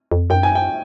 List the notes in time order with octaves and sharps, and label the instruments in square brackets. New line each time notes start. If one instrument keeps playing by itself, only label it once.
[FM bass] F2
[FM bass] F#2 [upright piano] G5
[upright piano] G#5
G5